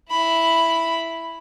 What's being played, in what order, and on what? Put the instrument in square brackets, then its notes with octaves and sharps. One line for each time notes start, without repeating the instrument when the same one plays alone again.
[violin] E4 B5